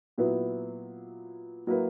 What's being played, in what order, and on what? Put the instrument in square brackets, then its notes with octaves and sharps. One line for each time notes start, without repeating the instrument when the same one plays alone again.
[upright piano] A#2 F#3 B3 E4 B4
F#3 A#3 E4 B4